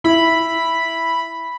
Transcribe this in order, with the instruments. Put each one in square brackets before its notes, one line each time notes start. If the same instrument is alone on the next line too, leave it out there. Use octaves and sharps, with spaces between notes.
[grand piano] E4 [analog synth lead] B5